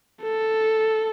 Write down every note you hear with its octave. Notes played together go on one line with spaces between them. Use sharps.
A4